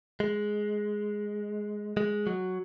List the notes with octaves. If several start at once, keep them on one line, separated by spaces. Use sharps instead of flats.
G#3
G#3
F#3